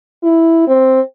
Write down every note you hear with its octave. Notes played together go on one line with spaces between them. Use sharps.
E4
C4